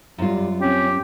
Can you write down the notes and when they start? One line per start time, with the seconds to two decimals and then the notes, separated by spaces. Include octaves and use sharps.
0.18 F#2 G3 F4
0.61 C4 C#4 G4